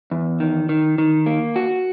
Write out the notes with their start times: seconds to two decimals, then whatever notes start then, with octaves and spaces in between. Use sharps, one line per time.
0.11 E2
0.40 D#3
0.69 D#3
0.98 D#3
1.26 A#3
1.56 F#4